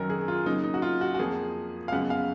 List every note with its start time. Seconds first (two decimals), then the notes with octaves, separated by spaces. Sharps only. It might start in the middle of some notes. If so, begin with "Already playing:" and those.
Already playing: F#2 D#3 F#3 A#4
0.10 G#4
0.28 F4
0.46 C#3 F#3 A#3 D#4
0.64 D#4
0.74 F#4
0.82 F4
1.01 F#4
1.14 F#4
1.19 F2 F3 A#3 G#4
1.88 F5
1.92 F#2 C#3 G#3 B3 F#5
2.10 F5